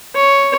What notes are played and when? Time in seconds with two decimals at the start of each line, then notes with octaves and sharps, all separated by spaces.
0.15 C#5